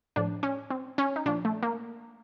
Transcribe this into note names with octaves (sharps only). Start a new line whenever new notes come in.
A2 F3 D4
C#4
C4
C#4
D#4
A#2 F3 D4
A3
A#3